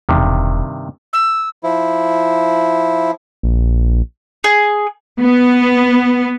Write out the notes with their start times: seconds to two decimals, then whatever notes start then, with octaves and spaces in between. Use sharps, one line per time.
0.09 E1 G2 C3 D#3
1.13 E6
1.63 F3 E4
3.43 A#1
4.44 G#4
5.19 B3